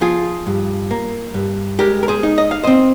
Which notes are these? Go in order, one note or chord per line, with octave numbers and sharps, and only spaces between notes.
F3 F4 G#4
G2
A#3
G2
G#3 G4 A#4
A#4
G#4 C5
D#4
D#5
F5
C4 C5 D#5